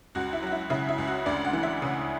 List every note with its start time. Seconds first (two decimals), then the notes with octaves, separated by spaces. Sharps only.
0.15 C#2 F#4
0.33 E4
0.43 F#3 F#4
0.52 E4
0.70 C#3 E4
0.89 E4
0.98 C#2
1.07 F#4
1.26 D2 D5
1.45 F#5
1.53 E3
1.63 E5
1.82 C#3